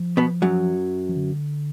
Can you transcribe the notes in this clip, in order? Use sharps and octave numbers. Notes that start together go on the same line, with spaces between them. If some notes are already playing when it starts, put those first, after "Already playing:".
Already playing: F3
B2 B3
F#2 F#3
F3
D3